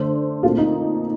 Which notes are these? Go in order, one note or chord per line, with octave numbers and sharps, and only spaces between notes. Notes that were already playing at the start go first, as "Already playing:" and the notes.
Already playing: D3 A3 D4 A4 C5
A#2 A3 C4 F4
D#4